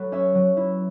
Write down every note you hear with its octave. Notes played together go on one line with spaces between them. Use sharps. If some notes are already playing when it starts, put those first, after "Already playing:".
Already playing: F#3 A4 B4
C#4 C#5 E5
F#3
E4